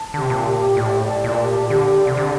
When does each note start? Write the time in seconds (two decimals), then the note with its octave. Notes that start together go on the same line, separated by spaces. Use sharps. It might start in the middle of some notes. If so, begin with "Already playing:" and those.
Already playing: A5
0.14 D3 G4
0.21 C3
0.30 A#2
0.46 G4
0.77 A2 D5
1.08 A5
1.24 A#2
1.40 G4
1.70 D3 G4
2.01 D5
2.07 C3
2.17 D3